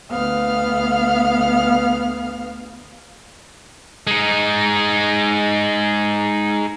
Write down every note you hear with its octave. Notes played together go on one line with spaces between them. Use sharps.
D2 B3 F5 F6
G#3 D#4